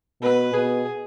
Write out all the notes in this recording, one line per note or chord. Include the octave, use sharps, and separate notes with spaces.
B2 B4
B2 G#4